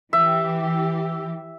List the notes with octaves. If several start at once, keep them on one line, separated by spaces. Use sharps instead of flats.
E3 G4 E5